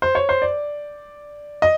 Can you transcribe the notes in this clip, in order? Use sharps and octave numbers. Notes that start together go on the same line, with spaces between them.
C5
C#5
C5
D5
D#5